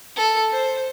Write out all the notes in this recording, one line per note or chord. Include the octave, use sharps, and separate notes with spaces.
A4
C5